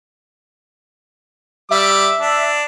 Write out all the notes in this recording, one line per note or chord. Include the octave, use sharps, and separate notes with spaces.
G3 E5 D6
D4